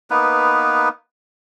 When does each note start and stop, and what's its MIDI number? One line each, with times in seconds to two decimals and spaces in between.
0.10 0.89 58
0.10 0.89 59
0.10 0.89 63
0.10 0.89 71